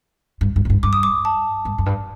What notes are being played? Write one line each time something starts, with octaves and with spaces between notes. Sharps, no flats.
G2
G2
A2
G2
G2 D6
D#6
D6
A5
G2
F#2
G2